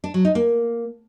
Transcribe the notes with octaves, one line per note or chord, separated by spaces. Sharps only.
D4
F#3
D#4
A#3